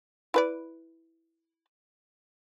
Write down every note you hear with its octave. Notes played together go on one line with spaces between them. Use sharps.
E4 B4 D5